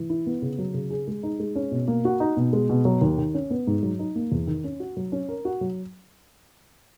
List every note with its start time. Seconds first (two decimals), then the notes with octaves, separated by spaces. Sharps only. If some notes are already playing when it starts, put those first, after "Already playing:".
Already playing: E3
0.10 E4
0.26 B3
0.42 C#3
0.58 F#3
0.74 C#3
0.90 G#4
1.07 G#3
1.23 D#4
1.40 G#3
1.56 C#4
1.71 B2
1.88 A#3
2.05 F#4
2.20 D#4
2.37 B2
2.53 G#3
2.69 B2
2.85 F#3
3.01 D#2
3.18 D#3
3.34 C#4
3.50 B3
3.67 G#2
3.83 F#3
3.99 D#4
4.16 A#3
4.32 E2
4.47 D#3
4.64 C#4
4.80 F#4
4.97 F#3
5.12 C#4
5.29 A#4
5.45 F#4
5.61 F#3